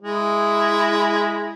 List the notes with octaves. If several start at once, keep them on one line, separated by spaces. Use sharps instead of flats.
G#3 E4